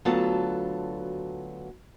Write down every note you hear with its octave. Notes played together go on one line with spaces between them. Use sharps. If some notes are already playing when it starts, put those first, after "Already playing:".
D2 F#3 B3 F4 A4 A5